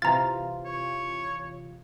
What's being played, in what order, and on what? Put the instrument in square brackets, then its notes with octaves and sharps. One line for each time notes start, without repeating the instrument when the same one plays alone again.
[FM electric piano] C3 E3 F4 [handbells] A#5 A6
[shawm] C#5